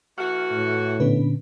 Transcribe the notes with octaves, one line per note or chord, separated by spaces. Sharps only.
E3 A3 F#4 F#5 F6
A2
A#2 D3 B3 C#4 D4 B4